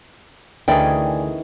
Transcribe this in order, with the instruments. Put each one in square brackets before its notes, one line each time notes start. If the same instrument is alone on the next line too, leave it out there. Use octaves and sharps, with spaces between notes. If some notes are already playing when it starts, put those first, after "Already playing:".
[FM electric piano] D2 A3 G#4 [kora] D#3 E3 C#4 [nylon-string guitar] D5 G5